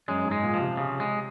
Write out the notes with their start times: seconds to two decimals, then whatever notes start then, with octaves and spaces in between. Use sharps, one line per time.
0.08 F#2 G#3
0.25 G#2
0.31 G#3
0.43 A#2
0.54 F3
0.60 C3
0.77 C#3
1.00 G#3